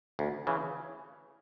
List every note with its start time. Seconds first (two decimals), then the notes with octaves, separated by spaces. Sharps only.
0.19 D2
0.47 C#3 E3